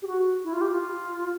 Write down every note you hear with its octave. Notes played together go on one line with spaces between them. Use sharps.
G4
F#4
E4
F4
G4
F4